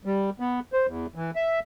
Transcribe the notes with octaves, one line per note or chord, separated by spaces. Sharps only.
G3
B3
C5
E2
E3
E5